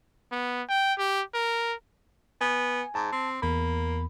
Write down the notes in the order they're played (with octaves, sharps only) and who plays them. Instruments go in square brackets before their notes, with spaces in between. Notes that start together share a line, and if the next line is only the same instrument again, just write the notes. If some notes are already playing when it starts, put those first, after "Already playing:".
[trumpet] B3
G5
G4
A#4
[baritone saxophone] B3 [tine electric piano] G#5
[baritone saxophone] G#2 [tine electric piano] A5
[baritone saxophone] C4
[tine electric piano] E2 B5 [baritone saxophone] A#3